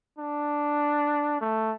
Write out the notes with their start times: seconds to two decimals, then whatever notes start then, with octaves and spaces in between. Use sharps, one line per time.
0.18 D4
1.41 A3